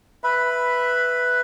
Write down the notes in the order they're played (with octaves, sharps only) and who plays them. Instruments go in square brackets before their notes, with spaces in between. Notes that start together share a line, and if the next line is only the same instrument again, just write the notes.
[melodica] B4 E5 B5